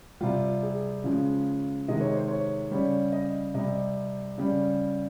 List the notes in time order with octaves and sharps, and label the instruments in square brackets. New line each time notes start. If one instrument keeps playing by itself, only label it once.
[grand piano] C3 G3 F4
G#4
C#3 F3 G#3
C3 D#3 G#3 D#5
C#5
C5
C#5
C#3 G3 C#5
D#5
C3 G3 D#5
C#3 G3